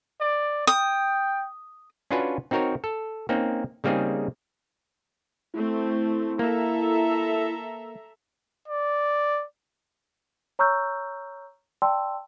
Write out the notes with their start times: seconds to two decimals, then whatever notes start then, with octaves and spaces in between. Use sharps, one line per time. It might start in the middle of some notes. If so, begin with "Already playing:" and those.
0.21 D5
0.67 G5 D#6
2.11 C#4 D4 F4 F#4 B4 G#5
2.51 C4 D#4 F#4 A#4 C#5
2.84 A4
3.29 A#3 C4 C#4 D#4
3.84 C#3 G3 A#3 C4 D#4 G#4
5.54 A3 C4 E4
6.39 A#3 A4 E5 A#5
8.68 D5
10.59 C#5 A#5 C#6 E6 F6 G6
11.82 D5 G5 A5 C6 E6